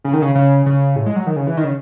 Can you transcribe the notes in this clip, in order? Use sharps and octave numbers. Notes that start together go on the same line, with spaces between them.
C#3
D#3
C#3
C#3
C#3
A2
G#3
F#3
D#3
C#3
E3
D#3
C#3